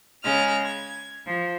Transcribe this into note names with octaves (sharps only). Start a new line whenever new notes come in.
C#3 G#3 F6
G#6
F3